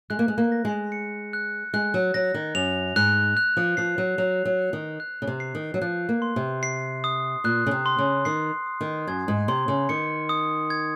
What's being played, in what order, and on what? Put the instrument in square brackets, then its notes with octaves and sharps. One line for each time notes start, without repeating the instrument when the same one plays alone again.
[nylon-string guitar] G#3 [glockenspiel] F#6
[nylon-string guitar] A#3
G#3
A#3
[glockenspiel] A#6
[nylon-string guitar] G#3
[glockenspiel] C#7
F#6
[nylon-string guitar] G#3 [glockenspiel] F#6
[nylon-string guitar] F#3
[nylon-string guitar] F#3 [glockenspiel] A#6
[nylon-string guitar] D#3
[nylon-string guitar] F#2 [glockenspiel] F7
[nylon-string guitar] G#2 [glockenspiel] F#6
[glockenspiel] F#6
[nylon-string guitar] F3
[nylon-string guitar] F3 [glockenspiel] C7
[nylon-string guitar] F#3
[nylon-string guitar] F#3 [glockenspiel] F7
[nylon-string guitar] F#3
[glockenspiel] F#6
[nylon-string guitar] D#3
[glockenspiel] F#6
[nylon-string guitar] C#3
C3
[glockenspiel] C7
[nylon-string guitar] D#3
F#3
[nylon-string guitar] F3 [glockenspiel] F#6
[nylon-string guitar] A#3
[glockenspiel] C6
[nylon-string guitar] C3
[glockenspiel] C7
D#6
[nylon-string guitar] A#2 [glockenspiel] F#6
[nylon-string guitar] C#3
C3
[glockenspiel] C6
[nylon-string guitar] C#3
[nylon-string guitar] D#3 [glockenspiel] C7
[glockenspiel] D#6
[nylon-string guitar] D#3
[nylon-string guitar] F#2 [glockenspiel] G#6
[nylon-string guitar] G#2
[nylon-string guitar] C3 [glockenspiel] C6
[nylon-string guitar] C#3
[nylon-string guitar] D#3 [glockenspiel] C#7
[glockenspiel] D#6
G#6